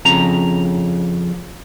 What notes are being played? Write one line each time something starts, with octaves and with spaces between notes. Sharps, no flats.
F2 C#3 A#5